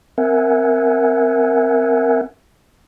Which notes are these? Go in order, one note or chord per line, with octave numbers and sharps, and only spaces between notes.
C4 A#4 E5 F#5 G#5